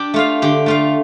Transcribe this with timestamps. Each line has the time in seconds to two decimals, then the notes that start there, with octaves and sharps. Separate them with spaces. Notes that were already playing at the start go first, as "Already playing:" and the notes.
Already playing: D4 G4 G5
0.14 A3 F4 F5
0.42 D3 G4 G5
0.66 A3 F4 F5